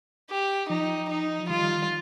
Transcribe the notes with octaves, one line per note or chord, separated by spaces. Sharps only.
G4
F3 D#4
D#4
F3
D#3 G3 F4